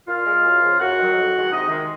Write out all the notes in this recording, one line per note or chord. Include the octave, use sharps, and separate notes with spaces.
A#2 F4 F5
G#3
F#2
C#3 F3
F#2 F#4 F#5
D#3 F#3
F2
D#3 G#3
C3 D#4 D#5
D#3 G#3